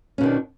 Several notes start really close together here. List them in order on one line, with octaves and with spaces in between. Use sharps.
C#4 B2 D#3 D4